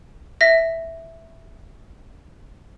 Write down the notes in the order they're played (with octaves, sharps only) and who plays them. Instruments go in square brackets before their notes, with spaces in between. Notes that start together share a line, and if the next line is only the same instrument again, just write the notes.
[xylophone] E5 A#6